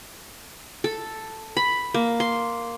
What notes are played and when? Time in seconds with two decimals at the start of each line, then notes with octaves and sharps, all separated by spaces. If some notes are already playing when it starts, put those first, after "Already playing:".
0.84 A4
1.57 B5
1.94 A#3
2.20 C6